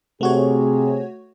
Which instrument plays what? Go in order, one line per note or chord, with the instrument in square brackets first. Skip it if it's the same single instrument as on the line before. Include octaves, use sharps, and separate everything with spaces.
[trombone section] C3 G#4 [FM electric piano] A3 F#4 C#5